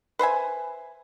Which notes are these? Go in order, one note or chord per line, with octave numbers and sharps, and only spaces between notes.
B4 C5 E5 G#5